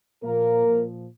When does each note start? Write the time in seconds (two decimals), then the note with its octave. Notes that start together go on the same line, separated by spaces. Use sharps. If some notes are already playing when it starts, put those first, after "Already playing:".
0.23 A#2 F3 A#3 A#4
0.66 A#2 F3